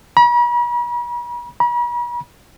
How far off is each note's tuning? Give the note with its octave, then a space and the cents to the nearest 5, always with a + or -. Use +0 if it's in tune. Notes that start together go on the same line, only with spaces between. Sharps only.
B5 -45
B5 -45